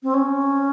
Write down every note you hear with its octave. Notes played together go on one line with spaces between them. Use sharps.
C4
C#4